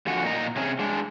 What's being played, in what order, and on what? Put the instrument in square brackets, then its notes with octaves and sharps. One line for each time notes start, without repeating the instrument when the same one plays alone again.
[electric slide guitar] F#2 D3 F3 F#4 F#5 G#5
A#2 A#3 D#5 A#5
C3 C#4 G#4
G#3 D4